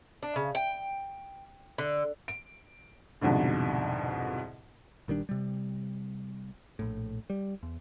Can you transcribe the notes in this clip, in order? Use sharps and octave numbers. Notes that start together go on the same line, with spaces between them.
D4
C#3
G5
D3
D7
C2 F2 G#2 B2 D3
A#1 D#3 G3 D4
C3 G3
A#1 A2
G3
E2